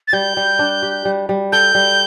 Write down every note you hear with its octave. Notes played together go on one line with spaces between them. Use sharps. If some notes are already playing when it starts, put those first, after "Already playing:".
A6
G3 G6
G3
D4
G4
G3
G3
A4 G6
G3